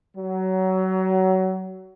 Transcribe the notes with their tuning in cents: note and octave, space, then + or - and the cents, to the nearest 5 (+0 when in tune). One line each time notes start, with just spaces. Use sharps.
F#3 +25